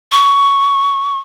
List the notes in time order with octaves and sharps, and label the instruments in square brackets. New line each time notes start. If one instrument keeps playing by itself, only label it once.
[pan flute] C#6